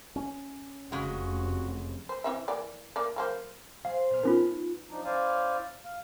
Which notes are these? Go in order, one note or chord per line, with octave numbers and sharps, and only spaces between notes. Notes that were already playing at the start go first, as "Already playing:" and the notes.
C#4
F1 C#3 G#3 F#4
C5
E3 C4 E5
E3 A#3 D5
A#3 D5
F#3 A#3 C5
G#4 C5 F5
A#2 B3 F6
G#3 B3 C#4 D#4 F4 A#4
F3 D4 D#4
C#4 E4 C5 D5 F5 G#5
F5